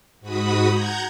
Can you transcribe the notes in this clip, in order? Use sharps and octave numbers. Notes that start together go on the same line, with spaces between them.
G#2 F#4 B5 D#6
F#5 A#5 G6 G#6